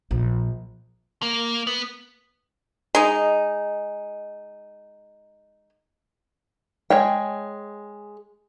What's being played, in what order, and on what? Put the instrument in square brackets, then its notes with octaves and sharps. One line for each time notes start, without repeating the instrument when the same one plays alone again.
[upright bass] A#1
[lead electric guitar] A#3
B3
[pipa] G#3 D#4
[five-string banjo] G#3 C#5 G5